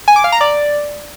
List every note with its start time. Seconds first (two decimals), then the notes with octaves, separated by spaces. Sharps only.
0.08 G#5
0.16 D6
0.24 F5
0.32 A#5
0.41 D5